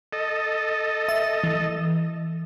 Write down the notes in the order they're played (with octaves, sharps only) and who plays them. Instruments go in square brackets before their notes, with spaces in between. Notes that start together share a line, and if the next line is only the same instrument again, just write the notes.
[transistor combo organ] A4 D#5
[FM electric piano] E5
E3